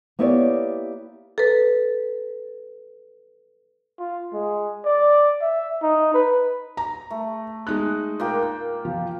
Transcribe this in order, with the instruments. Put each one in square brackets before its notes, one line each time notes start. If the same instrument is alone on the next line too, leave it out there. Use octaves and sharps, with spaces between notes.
[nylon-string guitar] A#3 B3 E4 G4 C#5 D5
[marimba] A4 B4
[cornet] F4
G#3
D5
E5
D#4
B4
[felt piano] A#5
[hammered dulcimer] A3
[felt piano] G#3 D#4 F#6
[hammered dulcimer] A#2 A#3 G5
[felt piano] F3